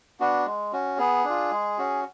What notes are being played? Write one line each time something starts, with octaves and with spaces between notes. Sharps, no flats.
B3 D4 F#4
G#3
C#4 F#4
B3 G#4
D4 F4
G#3
C#4 F#4